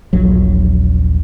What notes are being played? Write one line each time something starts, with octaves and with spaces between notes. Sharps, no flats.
D#1 A#1 F#3